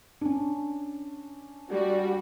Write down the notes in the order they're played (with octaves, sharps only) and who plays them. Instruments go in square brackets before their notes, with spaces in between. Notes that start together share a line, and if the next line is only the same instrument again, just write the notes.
[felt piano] C#4 D4
[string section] G3 F#4